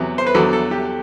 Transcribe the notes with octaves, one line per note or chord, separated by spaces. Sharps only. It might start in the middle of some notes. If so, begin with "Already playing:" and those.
Already playing: E2 C3 F#3
C5
B4
E2 D3 F#3 A4
A4
G4